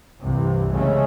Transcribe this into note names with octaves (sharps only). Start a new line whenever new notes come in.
C2 G2 C3 E3
C2 C#3 G#3 A3 C#4